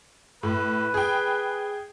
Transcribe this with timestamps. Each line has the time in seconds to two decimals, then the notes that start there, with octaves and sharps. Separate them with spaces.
0.43 A2 B4
0.94 G#4 G5